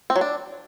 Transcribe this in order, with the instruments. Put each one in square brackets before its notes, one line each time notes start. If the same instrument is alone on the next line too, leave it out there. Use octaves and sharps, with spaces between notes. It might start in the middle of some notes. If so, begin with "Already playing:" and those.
[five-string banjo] C4
F#3
D4